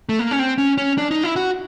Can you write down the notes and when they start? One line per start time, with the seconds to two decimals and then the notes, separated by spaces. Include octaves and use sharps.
0.09 A3
0.19 A#3
0.31 C#4
0.39 C4
0.58 C#4
0.78 C#4
0.98 D4
1.11 D#4
1.23 E4
1.36 F#4